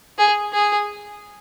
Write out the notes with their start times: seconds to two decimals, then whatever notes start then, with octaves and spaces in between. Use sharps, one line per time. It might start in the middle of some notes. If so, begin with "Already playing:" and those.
0.18 G#4
0.53 G#4